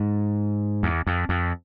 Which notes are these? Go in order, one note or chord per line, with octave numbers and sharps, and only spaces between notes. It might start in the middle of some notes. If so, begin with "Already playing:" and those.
Already playing: G#2
E2
F2
F2